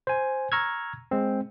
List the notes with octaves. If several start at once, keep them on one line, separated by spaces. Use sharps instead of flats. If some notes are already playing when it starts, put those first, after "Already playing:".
C5 G#5
A#5 C#6 E6 F6 G#6
G#3 C4